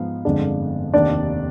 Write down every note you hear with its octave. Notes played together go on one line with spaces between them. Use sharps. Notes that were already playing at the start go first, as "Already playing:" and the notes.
Already playing: G#2 F3 B3 F5
G1 F2 D3 G#3 D4
F1 D#2 D#3 D4 D5